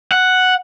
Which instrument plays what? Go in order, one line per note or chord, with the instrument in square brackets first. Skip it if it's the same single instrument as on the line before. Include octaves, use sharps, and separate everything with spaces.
[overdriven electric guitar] F#5